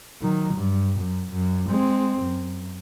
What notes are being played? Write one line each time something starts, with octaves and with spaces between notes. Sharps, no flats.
D#3 F#3
G2
F#2
F#2
G#3 C4
F#2